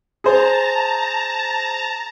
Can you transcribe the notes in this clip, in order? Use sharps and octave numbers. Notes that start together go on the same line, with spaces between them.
G#4 C5 A5 A#5